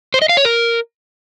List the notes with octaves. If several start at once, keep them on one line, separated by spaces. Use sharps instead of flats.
C5
D#5
F5
C#5
A#4